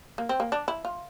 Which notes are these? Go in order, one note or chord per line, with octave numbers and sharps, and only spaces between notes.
A#3
C4
A#3
D4
E4
F4